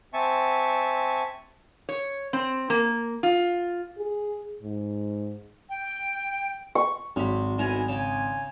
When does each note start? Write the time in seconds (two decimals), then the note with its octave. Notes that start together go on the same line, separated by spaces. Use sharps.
0.14 C4 E5 G#5 A5 C#6
1.89 C#5
2.33 C4
2.70 A#3
3.23 F4
3.98 G#4
4.62 G#2
5.70 G5
6.75 C#6
7.16 G#1 F#3 B5
7.59 B1 E4 A#4 G#5
7.89 C#3 G5 G#5